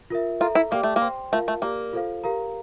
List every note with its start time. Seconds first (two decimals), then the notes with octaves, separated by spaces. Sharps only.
0.10 F4 A#4 E5
0.41 F4 A4 E5 A#5
0.55 E4
0.71 A#3 G4 D5 G5 D6
0.83 A3
0.96 A#3
1.02 C5 G5 C6
1.32 A3 F4 A#4 F5
1.48 A3
1.62 A#3 G4 A#4 D5
1.93 F4 A4 C5 F5
2.24 G4 A#4 F5 A#5